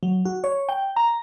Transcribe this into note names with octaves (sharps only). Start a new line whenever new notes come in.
F#3
F#4
C#5
G5
A#5